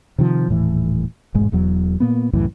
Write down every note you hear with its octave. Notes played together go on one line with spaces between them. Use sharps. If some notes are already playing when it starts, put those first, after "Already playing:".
C3 D#3 F3
D#1 A2 E3
E1 A1 G#2 G#3
E1 E2 F#3
A#2 A#3 B3
C2 F#2 A2 E3